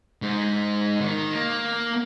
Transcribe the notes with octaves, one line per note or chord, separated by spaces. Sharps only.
G#2
D#3
A#3